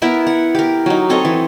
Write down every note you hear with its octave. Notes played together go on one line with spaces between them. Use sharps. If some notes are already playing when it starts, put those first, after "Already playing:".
B3 E4 A#4 E5
F#5
G4 A#4
F#3 D#4
C4 A4 C#5 D#5
E3